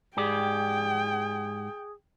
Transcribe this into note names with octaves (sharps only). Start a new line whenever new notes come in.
G#2 G4 G#4 D5 G5